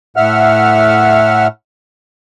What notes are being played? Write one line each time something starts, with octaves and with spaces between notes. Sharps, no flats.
A2 E5 F#5 F6